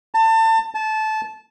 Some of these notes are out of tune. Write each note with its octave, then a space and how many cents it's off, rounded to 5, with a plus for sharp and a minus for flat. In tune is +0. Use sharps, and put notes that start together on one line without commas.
A5 +30
A5 -20